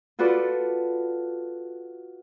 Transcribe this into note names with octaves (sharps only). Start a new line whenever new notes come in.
F4 F#4 A4 B4 D5